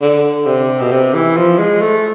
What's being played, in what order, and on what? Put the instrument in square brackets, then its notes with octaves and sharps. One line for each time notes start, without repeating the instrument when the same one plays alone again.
[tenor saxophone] D3
C3
B2
C3
E3
F3
G#3
A3